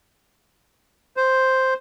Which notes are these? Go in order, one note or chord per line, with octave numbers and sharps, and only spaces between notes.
C5